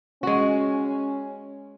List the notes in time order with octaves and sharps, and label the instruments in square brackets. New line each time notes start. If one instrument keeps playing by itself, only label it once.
[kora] G#3 F#4 [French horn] C#4